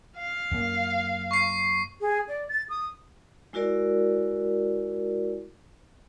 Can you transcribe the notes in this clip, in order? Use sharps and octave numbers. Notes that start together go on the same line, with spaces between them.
F5
F#2 A#3
C#6 C7
G#4
D5
A6
D#6
G#3 E4 F#4 A#4 D5